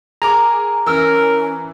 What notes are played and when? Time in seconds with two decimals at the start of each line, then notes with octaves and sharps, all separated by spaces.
0.22 G#4 A#4 A#5 D6
0.86 E3 C#4 A#4 E6 F6